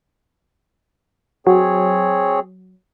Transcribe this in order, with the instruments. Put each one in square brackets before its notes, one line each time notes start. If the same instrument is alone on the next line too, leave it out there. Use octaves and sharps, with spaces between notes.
[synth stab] F#3 [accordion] C4 G#4 C#5